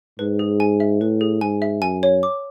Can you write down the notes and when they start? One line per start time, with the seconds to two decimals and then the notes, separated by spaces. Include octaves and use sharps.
0.19 G#2 B4
0.39 G#4
0.60 G#5
0.80 E5
1.01 A2 B4
1.21 G#4
1.41 G#2 G#5
1.62 E5
1.82 F#2 G#5
2.03 C#5
2.23 D6